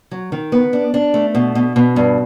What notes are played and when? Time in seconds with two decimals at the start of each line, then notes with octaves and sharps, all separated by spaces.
0.11 F#3
0.32 D#3
0.52 B3
0.73 D4
0.94 D4
1.14 A3
1.35 B2
1.55 B2
1.76 B2
1.96 G2